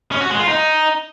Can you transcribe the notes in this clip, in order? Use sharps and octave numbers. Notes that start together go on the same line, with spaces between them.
C#4
F#4
G#3
F4
D#4